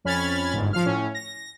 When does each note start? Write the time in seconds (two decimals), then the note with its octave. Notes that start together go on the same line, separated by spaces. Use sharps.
0.05 F2 C#4 B5 F6 G#6 A6
0.54 G1 G#2
0.73 F3 F5 F6
0.85 A2 C#4
1.15 A#6